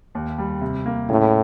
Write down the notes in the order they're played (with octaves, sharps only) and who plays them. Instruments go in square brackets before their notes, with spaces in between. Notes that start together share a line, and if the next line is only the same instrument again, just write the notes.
[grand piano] D#2
G3
C3
A#3
[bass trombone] A2 [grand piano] C#3